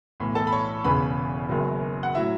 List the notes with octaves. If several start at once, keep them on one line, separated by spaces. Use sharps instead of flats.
B1 A2 E3
A4 A5
B5
C#5 C#6
E1 E2 C#3 B4 B5
F#1 F#2 D#3 F#3
F#5
A2 F#3 E4 E5